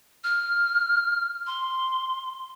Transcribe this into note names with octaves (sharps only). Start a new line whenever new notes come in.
F6
C6